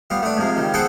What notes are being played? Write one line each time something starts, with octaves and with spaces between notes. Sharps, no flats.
G3 B3 F4
A3 B3 D4
G#2 C3 F3 G#3
C#2 D#3 G3
B3 G#4 A4 C5 F#5 G5